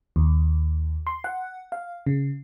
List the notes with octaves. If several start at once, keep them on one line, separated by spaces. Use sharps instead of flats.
D#2
C6
F#5
F5
C#3